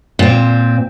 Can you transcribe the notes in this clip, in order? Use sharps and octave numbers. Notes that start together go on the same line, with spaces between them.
A#2 C4